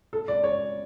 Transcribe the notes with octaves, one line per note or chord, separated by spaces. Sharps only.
A4
D5
C#5